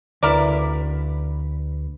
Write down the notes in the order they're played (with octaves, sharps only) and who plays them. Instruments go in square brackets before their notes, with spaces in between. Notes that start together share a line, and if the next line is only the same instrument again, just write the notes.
[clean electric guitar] D2 B4 [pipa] E4 A#4 D5